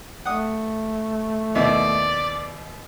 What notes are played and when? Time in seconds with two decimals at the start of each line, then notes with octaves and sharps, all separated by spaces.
0.26 A3 F#5 D#6
1.55 D#2 B2 E4 D5